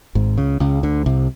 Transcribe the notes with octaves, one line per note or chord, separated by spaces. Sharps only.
G#1 G#2
C#2 C#3
C#2 C#3
D2 D3
C2 C3